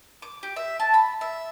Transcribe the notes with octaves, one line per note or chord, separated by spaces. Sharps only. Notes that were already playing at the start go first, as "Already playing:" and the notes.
D6
G4
E5
A5
B5
E5